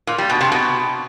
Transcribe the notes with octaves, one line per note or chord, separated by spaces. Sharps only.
A#2
G3
B2
C3
B2